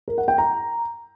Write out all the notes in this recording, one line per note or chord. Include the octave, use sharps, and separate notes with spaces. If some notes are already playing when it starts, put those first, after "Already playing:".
A#4
F#5
G5
A#5